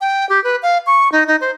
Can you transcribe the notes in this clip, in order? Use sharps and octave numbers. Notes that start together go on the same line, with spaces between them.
G5
G4
B4
F5
C#6
D#4
D#4
C5